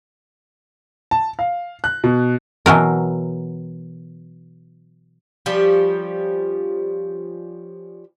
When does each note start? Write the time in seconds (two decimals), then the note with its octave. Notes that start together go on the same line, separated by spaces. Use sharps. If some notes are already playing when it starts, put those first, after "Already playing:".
1.11 A5
1.39 F5
1.84 F#6
2.04 B2
2.66 B2 E3 F#3 A#4
5.46 F3 G3 C#4 G4